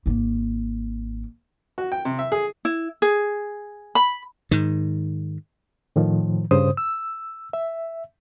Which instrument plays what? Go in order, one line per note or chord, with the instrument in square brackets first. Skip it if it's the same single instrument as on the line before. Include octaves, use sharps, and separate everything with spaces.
[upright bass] G#1 A#3
[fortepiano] F#4
G5
C3
E5
G#4
[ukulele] E4
G#4
B5
[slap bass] G#2 D#3
[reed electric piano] A2 D#3 F3
G2 C#3 C5 D#6
E6
E5